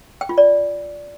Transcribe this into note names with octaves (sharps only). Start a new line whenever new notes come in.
G5
F4
D5